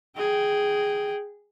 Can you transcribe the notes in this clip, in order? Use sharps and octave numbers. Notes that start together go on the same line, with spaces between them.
G#4 G5